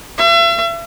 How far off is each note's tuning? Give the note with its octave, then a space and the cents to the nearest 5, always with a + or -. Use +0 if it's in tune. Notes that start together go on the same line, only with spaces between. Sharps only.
E5 +45